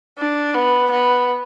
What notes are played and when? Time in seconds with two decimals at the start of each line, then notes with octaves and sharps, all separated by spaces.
0.18 D4
0.55 B3
0.91 B3